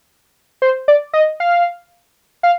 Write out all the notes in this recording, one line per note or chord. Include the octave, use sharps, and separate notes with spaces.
C5
D5
D#5
F5
F5